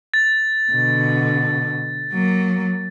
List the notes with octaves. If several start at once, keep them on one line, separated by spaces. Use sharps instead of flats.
A6
B2 D3
F#3 A#3